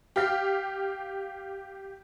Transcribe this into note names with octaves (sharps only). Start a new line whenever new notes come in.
G4 F5 F6 B6